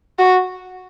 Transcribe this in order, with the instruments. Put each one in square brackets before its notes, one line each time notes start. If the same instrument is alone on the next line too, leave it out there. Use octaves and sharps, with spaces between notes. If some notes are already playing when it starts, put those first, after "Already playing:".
[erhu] F#4